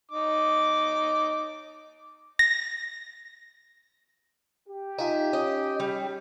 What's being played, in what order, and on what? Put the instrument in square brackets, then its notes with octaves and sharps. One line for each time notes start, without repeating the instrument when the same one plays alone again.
[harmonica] D#4 D6
[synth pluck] A#6
[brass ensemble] G4
[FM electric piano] D#4 F4 [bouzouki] E5 G#5
[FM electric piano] C#4 [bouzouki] D#5
[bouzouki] G3